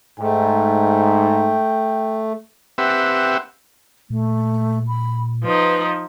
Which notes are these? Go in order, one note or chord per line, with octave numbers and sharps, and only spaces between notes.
G#2 A3 G5
C4 G4 B4 E5 F#5
A#2 A3
B5
F3 D#4 B4